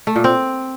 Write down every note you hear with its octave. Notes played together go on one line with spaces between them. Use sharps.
A3
A#2
C4